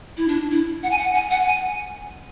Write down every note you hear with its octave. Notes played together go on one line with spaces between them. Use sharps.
E4
D4
E4
F#5
G#5
F#5
G#5
F#5
G#5